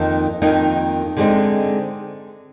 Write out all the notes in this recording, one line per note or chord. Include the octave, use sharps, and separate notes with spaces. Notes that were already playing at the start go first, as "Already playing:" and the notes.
Already playing: F2 D#3 A#3 D#4
F2 D#3 A#3 D#4
D3 G#3 C4 D#4